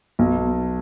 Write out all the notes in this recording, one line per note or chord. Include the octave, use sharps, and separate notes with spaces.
B1